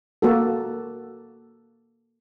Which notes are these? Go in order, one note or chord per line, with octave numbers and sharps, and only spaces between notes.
A#3 F#4 A4